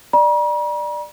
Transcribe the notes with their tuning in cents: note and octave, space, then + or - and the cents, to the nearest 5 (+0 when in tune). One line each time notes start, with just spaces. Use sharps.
D5 +20 A#5 +45